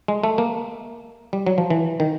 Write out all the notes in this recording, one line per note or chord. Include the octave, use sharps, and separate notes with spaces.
G#3
A3
A#3
G3
F#3
F3
E3
D#3